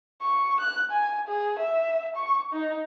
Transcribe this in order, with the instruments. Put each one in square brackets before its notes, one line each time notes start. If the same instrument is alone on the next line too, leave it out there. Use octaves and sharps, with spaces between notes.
[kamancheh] C#6
F#6
G#5
G#4
E5
C#6
D#4